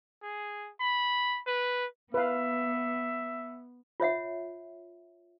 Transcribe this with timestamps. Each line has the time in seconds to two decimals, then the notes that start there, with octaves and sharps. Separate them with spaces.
0.22 G#4
0.80 B5
1.47 B4
2.14 B3 B4 E5 F5
4.00 F4 C#5 E5 F#5